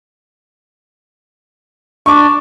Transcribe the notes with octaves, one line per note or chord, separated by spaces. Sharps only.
D4 C#6 D6